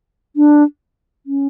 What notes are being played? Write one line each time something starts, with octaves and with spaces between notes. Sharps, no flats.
D4
C#4